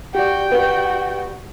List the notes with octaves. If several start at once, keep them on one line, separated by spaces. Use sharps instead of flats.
F#4 G4 D5 G5
B3 F#4